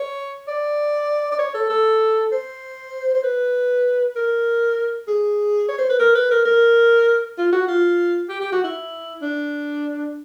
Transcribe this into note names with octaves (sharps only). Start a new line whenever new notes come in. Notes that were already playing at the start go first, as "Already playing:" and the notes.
Already playing: C#5
D5
D5
C#5
A4
A4
C5
C5
B4
A#4
G#4
C#5
C5
B4
A#4
B4
A#4
A#4
F4
F#4
F4
G4
G4
F#4
E4
D4